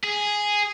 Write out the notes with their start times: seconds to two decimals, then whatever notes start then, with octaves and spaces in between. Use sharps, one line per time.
0.04 G#4